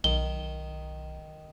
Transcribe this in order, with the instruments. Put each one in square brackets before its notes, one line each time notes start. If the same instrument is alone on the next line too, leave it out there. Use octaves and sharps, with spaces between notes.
[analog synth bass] B1 [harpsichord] D#3 [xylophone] G7